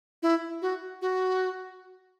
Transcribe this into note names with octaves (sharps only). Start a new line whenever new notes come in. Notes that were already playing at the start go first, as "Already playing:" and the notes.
E4
F#4
F#4